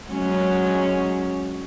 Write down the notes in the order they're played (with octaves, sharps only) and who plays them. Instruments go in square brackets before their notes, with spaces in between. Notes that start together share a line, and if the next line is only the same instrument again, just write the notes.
[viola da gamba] F#3 G#3 C#4